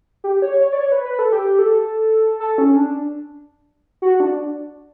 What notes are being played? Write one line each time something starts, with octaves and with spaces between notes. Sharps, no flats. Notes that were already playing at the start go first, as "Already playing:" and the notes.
G4
C#5
C#5
D5
C#5
B4
B4
A4
G4
A4
A4
C#4
D4
F#4
D4